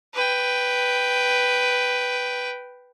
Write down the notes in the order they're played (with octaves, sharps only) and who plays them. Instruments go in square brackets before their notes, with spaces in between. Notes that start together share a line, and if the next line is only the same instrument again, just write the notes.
[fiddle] B4 G5